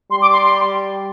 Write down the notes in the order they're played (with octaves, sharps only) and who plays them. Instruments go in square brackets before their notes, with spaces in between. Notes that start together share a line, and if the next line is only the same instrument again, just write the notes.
[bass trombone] G3 [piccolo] C6
[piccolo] D6
C6
C6